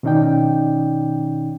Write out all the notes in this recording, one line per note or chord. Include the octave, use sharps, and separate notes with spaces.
B2 D#3 C#4 D#4 D5 G5